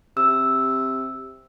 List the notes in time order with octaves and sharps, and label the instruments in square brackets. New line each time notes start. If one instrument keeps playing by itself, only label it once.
[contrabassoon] C3 [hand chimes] E6